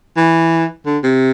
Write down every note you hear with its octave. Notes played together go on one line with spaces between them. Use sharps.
E3
D3
C3